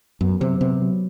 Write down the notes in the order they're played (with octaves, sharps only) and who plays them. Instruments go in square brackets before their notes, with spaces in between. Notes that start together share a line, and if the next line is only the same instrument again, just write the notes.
[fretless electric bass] F#2 [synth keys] B3
[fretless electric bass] C3 [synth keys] F#3
[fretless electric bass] C3 [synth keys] B3
[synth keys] F#3